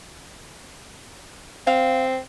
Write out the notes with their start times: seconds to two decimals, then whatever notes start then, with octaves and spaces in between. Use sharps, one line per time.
1.67 C4 F5